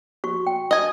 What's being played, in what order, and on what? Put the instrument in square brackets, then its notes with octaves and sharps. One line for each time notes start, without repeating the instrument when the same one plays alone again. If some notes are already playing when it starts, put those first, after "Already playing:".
[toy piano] F#4 C#6
G5
[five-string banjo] D#5 G#5